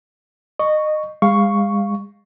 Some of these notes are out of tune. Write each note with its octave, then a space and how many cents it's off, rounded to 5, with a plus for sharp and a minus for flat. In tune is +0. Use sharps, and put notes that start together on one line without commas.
D#5 -25 C#6 +0
G#3 -35 F5 +0 C#6 +0